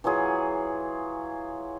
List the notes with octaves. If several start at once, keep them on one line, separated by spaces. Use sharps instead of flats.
E3 F#3 F4 G#4